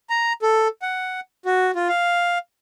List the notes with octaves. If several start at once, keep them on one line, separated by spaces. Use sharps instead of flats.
A#5
A4
F#5
F#4
F4
F5